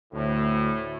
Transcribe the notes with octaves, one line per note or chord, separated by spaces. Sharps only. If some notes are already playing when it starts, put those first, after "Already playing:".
D2 A2